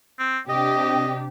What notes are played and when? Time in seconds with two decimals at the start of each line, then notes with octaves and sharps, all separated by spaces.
0.19 C4
0.50 C3 D4 G4 D#5